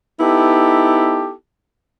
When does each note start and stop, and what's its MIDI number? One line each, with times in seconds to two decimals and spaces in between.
0.20 1.33 59
0.20 1.33 63
0.20 1.33 64
0.20 1.33 67
0.20 1.33 69